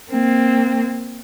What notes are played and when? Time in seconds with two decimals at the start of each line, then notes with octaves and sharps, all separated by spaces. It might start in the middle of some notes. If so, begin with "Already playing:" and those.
0.11 A#3 C4